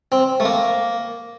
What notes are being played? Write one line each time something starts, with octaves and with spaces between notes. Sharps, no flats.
C4
A3
A#3